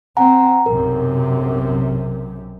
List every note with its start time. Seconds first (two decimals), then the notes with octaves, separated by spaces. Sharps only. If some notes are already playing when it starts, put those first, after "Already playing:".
0.17 C4 F#5 G#5 A#5
0.66 B1 F#2 C3 A#4